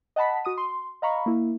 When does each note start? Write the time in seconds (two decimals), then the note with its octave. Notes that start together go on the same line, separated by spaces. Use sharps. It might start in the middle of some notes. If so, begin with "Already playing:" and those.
0.16 D#5 F#5 A5 B5 B6
0.45 F#4 D#6 D#7
0.58 C6
1.02 D#5 F5 A#5 B5 C#6
1.26 A#3 E4